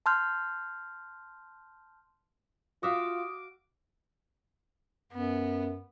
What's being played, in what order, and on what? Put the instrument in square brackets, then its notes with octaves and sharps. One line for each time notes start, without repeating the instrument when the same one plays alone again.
[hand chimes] A5 C6 F6 G6
[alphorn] F4 [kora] F#4 E5 F5 [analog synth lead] D6 [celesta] D#6
[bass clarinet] F#2 [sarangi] B3